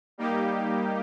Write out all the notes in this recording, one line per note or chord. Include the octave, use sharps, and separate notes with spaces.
G3 A#3 D#4 G4